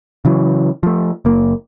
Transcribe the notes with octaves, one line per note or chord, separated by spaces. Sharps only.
C#3 E3 F#3
F3 A3
F#1 A#3